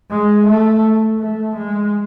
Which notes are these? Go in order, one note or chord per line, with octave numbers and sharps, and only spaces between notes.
G#3
A3
A3
G#3